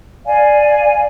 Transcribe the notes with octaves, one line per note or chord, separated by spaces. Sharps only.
D5 F5 G#5